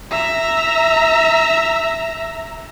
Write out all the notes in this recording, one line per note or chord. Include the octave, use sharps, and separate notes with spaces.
E5 A#5